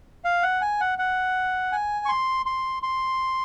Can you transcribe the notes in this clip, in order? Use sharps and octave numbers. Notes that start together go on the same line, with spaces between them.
F5
F#5
G#5
F#5
F#5
G#5
C#6
C6
C6
C6